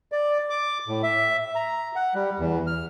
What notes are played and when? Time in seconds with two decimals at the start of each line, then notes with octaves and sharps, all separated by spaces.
0.12 D5
0.50 D6
0.88 A2
1.03 E5
1.55 A#5
1.95 F#5
2.15 G3
2.39 E2
2.67 F6